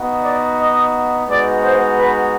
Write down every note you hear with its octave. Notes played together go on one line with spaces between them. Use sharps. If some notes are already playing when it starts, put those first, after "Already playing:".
Already playing: B3 D#4 F#4
D5
D#5
G#3 B3 D#4 F#4 D5
C5
B4